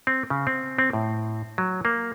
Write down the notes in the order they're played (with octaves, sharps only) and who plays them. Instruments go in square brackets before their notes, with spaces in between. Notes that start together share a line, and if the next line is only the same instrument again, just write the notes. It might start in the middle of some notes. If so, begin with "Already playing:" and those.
[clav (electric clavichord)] C4
C#3
C4
C4
A2
F#3
A#3